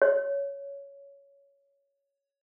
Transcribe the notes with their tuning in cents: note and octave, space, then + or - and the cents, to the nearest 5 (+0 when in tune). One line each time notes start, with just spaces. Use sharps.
C#5 +10